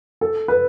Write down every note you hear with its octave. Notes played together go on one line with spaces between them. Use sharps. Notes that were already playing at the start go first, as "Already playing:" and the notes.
A4
B4